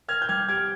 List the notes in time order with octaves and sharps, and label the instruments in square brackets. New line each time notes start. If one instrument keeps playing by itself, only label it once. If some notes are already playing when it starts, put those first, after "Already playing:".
[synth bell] A#4 [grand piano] F6 G#6
[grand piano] G6
[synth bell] G3 [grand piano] F6 G#6
[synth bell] G4 [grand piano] F6 G#6